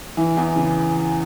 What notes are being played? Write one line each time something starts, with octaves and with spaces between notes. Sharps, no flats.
E3
E2
C#3